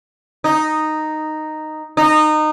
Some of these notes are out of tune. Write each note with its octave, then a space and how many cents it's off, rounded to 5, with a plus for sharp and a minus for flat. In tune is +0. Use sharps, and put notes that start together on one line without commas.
D#4 -5
D#4 -20